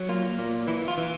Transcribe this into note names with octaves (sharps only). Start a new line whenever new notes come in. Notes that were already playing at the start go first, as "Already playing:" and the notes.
Already playing: F#3
A#3 F4
A#2
E3 E4
F4
E3